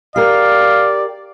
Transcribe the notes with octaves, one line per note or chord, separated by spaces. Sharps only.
G4 A#4 D5 F5